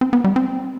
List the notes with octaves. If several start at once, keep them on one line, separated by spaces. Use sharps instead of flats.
C4
B3
G3
C4